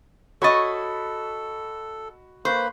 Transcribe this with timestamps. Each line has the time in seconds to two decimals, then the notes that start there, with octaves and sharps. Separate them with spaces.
0.42 F#4 A4 C#5 D#5 B5 A6
2.45 A#3 B4 C5 B5